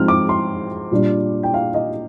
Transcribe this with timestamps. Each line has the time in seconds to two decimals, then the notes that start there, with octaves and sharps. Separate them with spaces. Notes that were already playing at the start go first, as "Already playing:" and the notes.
Already playing: G#2 F3 C4 D#4 F6
0.08 D6
0.29 C6
0.91 A#2 G3 D4
1.43 G5
1.54 F5
1.74 D#5